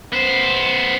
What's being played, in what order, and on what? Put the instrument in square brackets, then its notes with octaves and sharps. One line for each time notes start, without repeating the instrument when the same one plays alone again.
[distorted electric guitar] B3 C5